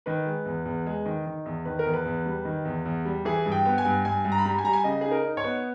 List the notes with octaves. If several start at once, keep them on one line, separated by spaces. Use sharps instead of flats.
D#3 B4
G#3
E2
E2
G#3
D#3
D#3
E2
D#3 B4
A#4
E2
B4
E2
G3
D#3
E2
E2
G3
E3 G#4
G2
G5
B3
G#5
G2
G2 G#5
G2
A#5
B5
G3 A#5
G#5
G3 A#5
G#5
C#3 D#5
D#4 G#4
A#4
D#4
C#5
B3